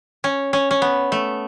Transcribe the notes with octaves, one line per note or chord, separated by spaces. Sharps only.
C#4
C#4
C#4
B3
A3